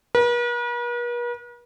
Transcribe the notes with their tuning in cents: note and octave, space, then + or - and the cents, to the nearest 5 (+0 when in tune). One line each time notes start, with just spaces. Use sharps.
B4 -45